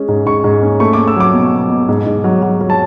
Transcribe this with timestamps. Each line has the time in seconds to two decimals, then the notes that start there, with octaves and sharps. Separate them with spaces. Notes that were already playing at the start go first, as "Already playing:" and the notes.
Already playing: G#3 C#4
0.09 G#2
0.26 G#2 C#6
0.44 G#2
0.62 C#4
0.80 A3 C#6
0.93 A3 D6
1.08 E6
1.16 F#3 D6
1.34 B2
1.53 B2
1.70 B2
1.89 G#2
2.06 G#2
2.24 F#3
2.42 F#3
2.61 F#3
2.70 A5